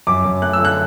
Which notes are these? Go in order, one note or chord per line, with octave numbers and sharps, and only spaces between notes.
F#2 D6
F#2
A3 F#6
E6
D3
F#6